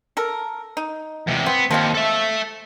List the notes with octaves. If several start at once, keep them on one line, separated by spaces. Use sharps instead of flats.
A4 A#4
D#4
E2 C3
B3 C4
D#2 F3 C4 F5
A4 E5